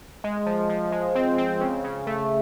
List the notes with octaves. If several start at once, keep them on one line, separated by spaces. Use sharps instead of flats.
G#3
F3
F3
G#3
C4
C4
C#3
C#3
A3